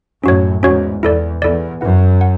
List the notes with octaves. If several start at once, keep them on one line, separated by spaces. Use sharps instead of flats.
F#2 A2 C#4 F#4 C#5
E2 G#2 C#4 F#4 C#5
E2 E4 A4 D5
E2 E4 A4 D5
F#2 E4 B4 F#5
F#5